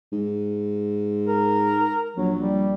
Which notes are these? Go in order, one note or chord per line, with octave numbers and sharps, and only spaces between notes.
G#2
A#4
A#1 F#3
G3